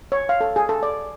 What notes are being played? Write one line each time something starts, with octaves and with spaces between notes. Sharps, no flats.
C#5
F5
A4
G#4
A4
D5